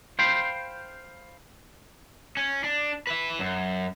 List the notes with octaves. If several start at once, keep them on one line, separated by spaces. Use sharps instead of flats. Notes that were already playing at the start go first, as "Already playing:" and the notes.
C5 F5 G5 B5 C6
C#4
D4
B4 E5
F#2